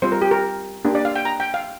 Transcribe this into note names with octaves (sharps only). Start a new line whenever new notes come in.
G3 C4 F4 C5
A#4
G4
A#4
A#3 D4 G4
D5
F5
G5
A#5
G5
F5